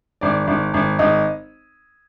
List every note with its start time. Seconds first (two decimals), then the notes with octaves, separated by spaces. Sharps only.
0.21 G#1 D5
0.47 G#1
0.74 G#1
0.99 G#1 D#5